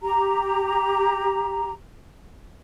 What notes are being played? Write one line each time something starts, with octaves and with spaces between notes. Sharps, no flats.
G4 A#5